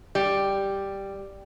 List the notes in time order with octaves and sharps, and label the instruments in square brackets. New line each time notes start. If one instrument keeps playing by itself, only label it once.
[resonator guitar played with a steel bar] G3